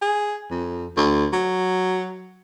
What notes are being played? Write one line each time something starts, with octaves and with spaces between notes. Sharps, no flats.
G#4
F2
D2
F#3